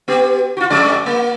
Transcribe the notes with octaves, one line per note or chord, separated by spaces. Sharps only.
B3 G4
F4 F#4
F2 G#3 D5
A#3